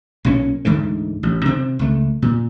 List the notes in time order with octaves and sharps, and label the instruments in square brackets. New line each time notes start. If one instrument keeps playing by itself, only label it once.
[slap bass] B1 A#2 C#4
D2 G#2 D3 E3
A1
C3 C4
C#2 A3
A#2